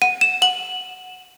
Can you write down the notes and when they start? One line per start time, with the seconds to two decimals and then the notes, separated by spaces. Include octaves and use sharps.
0.02 F#5 D#7
0.21 E7
0.42 F#5 F#7